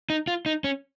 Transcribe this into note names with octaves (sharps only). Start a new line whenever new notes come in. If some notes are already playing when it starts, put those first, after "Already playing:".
D#4
F4
D#4
C#4